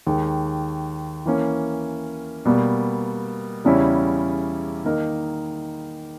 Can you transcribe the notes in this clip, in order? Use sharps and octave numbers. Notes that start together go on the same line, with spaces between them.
D#2 D#3 G#3
E3 A#3 C#4
B2 G3 A#3
E2 C#3 G3 C#4 E4
D#3 A#3 D#4 A#4